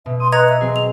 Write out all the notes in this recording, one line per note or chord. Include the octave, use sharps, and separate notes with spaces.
B2 E5
C6 D#6
B4 D#5 A#5 C#6 G#6
E5
F#3 C4 G#4
F7